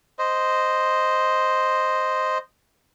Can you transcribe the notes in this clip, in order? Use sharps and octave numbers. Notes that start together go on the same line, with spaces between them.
C5 D#5